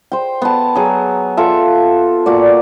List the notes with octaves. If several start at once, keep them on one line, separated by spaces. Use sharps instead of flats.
C5 G5
B3 A5
F#3 G#4
F4 A4 E5
A#2 F#4 D5